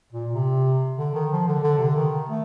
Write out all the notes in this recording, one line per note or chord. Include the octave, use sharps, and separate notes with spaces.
A#2
C3
D3
D#3
F3
D3
D3
C3
D3
D#3
A3